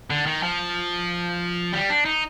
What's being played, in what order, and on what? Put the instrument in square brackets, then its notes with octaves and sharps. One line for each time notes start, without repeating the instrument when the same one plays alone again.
[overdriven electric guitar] D3
D#3
F3
G3
D4
D#4